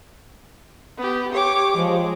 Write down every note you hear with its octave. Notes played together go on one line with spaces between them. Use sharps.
B3 G4
G4 C#5 D6
F3 G#3